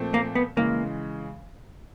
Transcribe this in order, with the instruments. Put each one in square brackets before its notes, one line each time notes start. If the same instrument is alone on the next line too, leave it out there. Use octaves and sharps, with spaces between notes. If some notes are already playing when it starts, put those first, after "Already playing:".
Already playing: [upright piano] A#2 F3 A3 C4
[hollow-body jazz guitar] A#3
B3
[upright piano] C#3 E3 G#3 [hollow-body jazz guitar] A#3